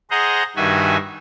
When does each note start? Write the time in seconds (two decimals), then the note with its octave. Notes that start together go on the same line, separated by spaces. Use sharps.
0.11 G#4 C5 D#5 F#5 A#5
0.56 G2 D#3 F#4 E5 G#5